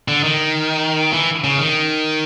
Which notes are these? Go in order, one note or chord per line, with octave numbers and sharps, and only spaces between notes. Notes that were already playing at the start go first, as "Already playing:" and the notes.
D3
D#3
E3
C#3
D#3